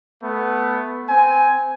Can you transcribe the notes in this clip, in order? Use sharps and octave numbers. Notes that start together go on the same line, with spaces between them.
A3 B3
C4 G#5